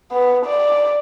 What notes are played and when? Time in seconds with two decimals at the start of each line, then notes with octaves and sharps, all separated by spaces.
0.12 B3
0.46 D5